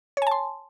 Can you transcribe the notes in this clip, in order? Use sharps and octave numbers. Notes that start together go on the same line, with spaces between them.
C#5 G#5 A5 C6